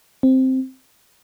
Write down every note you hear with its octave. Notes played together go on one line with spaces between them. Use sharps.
C4